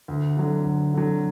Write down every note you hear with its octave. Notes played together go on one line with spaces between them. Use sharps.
D2
D3 F#3
D2
D3 F#3